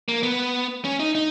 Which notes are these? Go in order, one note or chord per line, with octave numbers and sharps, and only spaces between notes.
A#3
B3
C#4
D#4
D#4